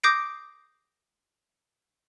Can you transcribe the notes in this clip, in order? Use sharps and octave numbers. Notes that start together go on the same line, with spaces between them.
D6 D#6 G6 A#6 C7 D7